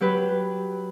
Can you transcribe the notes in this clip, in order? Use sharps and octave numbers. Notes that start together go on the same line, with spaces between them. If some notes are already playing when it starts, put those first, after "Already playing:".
F#3 G4 B4